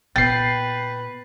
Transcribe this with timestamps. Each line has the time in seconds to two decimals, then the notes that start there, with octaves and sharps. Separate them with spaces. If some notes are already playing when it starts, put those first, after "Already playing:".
0.16 A#2 B3 B4 G5 A6 C7